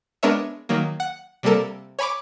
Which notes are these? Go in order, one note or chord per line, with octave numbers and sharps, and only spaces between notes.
G#3 B3 D4 A#4 C#5 E5
D#3 F#3 A#3
F#5
C3 G3 A#3 A4 A#4
C#5 G#5 B5 C#6 D6